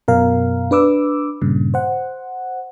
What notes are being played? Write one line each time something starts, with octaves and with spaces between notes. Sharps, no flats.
F#2 B2 A#4 F5
D4 B4 D6 E6
G2 A#2 C#3
C5 F#5